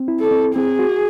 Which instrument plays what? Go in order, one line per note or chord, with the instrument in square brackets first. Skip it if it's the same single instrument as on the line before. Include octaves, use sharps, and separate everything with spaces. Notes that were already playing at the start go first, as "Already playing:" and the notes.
Already playing: [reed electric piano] C4
E4
[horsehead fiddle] A4
[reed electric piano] C4
[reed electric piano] C4 [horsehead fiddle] G#4
[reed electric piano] F#4